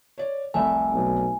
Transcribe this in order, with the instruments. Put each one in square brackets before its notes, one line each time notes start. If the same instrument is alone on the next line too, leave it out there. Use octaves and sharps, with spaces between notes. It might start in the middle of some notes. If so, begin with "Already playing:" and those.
[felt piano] C#5 D5
[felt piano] F1 C2 D5 [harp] A3 E5 B5 [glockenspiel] G#5
[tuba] B1